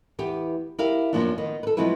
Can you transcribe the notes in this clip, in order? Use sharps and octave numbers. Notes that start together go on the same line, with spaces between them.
E2 B3 G4
E4 G4 A#4 F5
F#2 C3 F3 A#3 B3 D4
D#3 B3
A4 B4
F3 F#3 G#3 C4 E4 B4